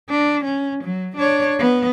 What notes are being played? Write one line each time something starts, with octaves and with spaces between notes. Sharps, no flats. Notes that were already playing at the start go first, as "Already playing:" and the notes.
D4
C#4
F#3
D4 C#5
B3